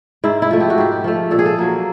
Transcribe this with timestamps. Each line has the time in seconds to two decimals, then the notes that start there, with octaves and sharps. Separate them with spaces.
0.24 G#2 E4
0.42 E4
0.51 F3 A3
0.60 G4
0.70 F#4
0.78 G#2 G4
1.04 F3 A3
1.31 A#2 A4
1.39 G#4
1.46 A4
1.58 F#3 A#3